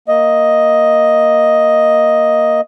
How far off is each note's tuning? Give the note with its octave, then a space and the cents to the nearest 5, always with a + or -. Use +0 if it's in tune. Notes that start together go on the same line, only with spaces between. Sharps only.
A#3 +0 D#5 +5